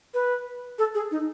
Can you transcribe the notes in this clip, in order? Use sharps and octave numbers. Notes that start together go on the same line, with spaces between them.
B4
A4
G#4
D#4